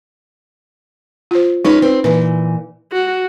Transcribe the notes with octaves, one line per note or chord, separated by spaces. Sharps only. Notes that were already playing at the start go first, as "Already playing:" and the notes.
F4 C5
G#3 C#4 D#4 B4
C4 B4
A#2 E3 B4
F#4